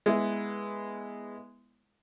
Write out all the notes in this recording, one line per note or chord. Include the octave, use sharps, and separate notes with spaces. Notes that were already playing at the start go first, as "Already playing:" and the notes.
G#3 B3 E4